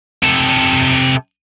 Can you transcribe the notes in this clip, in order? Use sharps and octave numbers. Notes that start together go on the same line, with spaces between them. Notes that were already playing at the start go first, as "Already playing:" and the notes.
C3 A4